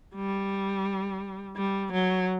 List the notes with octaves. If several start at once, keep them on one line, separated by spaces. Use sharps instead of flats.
G3
G3
F#3